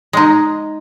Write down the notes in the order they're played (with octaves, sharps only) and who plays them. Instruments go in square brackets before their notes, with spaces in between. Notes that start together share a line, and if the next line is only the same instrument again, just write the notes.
[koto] G#3 D#4